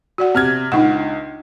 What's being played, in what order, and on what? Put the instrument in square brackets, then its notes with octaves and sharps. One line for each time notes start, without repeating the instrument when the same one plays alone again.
[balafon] F#4 D5 F#5
[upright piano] C3 F6 G#6
[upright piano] C#2 [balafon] D4 D#4 F#5